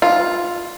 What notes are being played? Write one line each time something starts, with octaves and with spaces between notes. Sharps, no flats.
F4